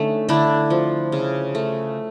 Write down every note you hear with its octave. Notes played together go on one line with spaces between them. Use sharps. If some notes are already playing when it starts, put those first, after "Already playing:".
Already playing: D3 A3 C#4 D#4
D3 D4 E4
F3
C#3
A3